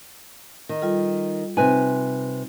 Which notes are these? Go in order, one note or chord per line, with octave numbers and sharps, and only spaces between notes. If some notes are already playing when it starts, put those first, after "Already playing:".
D#3
G3 F4 A4
C3 C4 D#4 B4 G#5